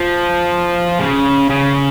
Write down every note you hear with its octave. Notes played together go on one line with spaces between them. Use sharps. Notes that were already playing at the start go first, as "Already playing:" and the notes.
Already playing: F3
C#3
C#3